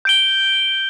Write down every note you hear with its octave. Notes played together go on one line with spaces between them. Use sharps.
G6 D7 G7